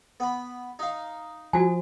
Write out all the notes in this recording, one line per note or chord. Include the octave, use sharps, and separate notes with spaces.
B3 B5
D#4 F5
F3 F#4 G#5